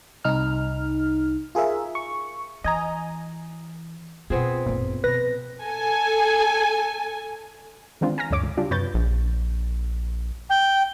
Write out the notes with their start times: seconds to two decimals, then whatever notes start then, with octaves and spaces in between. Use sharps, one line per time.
0.25 C2 D#4 F6
1.55 F4 G#4 A#4 E5
1.95 C#6
2.64 E3 D#5 G#5 A#5
4.30 B2 B3 C4 F4 G#4
4.66 G#1 F#2 A#2
5.04 B2 F3 B4 A#6
5.61 A4 G#5
8.01 D#3 E3 G#3 C4 D4 F4
8.18 G#5 A#5 F6 A#6
8.30 D2 G2 D3 C#5 D6
8.44 C#2
8.57 C#3 G3 D4 F4 G4
8.71 F#2 C3 B4 C#5 G6 A6
8.94 A#1
10.50 G5